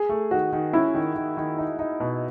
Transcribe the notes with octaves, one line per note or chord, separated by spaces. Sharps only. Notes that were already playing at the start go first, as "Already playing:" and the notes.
Already playing: G#4
A3
D#3 F#4
D#3
C#4 E4
D#3
D#3
D#3
D#4
D#4
B2